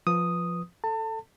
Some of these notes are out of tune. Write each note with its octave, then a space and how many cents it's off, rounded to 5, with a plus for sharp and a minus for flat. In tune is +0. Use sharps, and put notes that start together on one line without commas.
F3 +0 B4 +0 D#6 +0
A4 +0 A5 +30